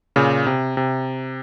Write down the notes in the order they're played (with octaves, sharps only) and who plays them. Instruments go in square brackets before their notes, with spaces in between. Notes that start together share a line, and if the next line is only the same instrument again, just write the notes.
[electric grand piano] A#2 C#3
C3
C3